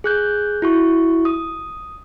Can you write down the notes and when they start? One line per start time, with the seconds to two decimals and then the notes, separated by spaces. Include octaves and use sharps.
0.04 G#4 F#6 G6
0.62 E4 F#4 C#6
1.25 D#6